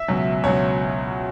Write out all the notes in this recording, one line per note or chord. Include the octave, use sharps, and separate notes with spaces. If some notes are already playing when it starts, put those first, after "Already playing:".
Already playing: E5
C#2 B2 F#3
C#2 B2 F#3 C#5